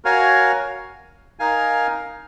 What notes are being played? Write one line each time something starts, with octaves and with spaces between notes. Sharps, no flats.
F#4 A#4 C#5 F5 G#5
D#4 A#4 F5 G#5